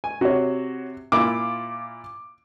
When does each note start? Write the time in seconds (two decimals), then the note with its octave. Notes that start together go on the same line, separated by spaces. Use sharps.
0.04 G#5
0.21 C3 F#4 C#5
1.12 A#2 E4 F4 D6